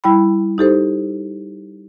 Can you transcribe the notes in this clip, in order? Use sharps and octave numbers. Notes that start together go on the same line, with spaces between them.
G3 E4 G5 B5
D#4 G4 A4 C5